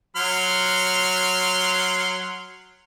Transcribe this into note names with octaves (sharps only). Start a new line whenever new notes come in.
F#3 C6 F6